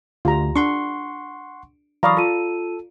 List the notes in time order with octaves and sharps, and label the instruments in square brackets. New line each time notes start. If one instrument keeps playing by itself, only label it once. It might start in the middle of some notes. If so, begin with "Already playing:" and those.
[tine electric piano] D2 [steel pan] F4 G4 A#5
[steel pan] D4 [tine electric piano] F#5 C6 C#6
[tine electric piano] E3 F#3 [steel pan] D5 F5 A#5 [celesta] B5 C#6 D#6
[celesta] F4 D#7 [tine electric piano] A4